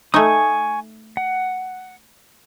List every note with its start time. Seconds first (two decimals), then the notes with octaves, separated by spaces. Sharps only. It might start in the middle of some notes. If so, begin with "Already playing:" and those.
0.14 A3 D#4 G#5 C#6 D#6
1.17 F#5